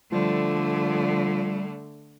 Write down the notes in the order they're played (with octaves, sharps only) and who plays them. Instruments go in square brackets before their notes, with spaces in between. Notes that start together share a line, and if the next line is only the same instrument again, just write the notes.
[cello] D3 A3 [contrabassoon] F3 [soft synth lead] G3